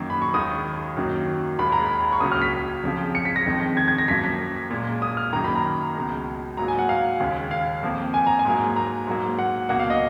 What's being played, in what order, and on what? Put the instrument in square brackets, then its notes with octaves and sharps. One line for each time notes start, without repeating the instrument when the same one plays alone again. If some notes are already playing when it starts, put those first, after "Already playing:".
Already playing: [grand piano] F#2 D#3 F#3 A#3
B5
C#6
D#2 D#3 G#3 D#6
F#2 D#3 F#3 A#3
D#2 D#3 G#3 B5
A#5
B5
C#6
C#2 C#3 F#3 A#3 D#6
F6
B6
F2 C#3 F3
C#7
B6
A#6
F2 D#3 G#3
G#6
G#6
A#6
F#2 F3 A#3 B6
B6
A#2 G#3
D#6
F6
F#2 D#3 A#3 A#5
B5
A#5
C#2 B2 G#3
G#2 F#3 A#3 A#5
G#5
F#5
F5
D#2 C#3 G#3
F5
F2 F3 A#3
G#5
A#5
G#5
G#2 F#3 A#3
A#5
G#2 F#3 A#3
F#5
C#2 B2 F#3 A#3 F#5
F5
D#5